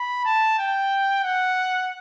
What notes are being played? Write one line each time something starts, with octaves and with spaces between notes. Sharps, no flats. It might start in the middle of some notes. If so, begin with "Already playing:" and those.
Already playing: B5
A5
G5
F#5